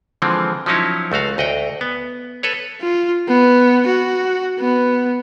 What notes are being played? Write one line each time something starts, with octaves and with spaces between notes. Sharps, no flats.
D3 E3 F3 G#3 C4
F3 F#3 C#4 D#4 E4 C#5
C#2 A3 F#4 F5
D2 D#5 F#5 G5
B3
A4 B4 C#5
F4
B3
F#4
B3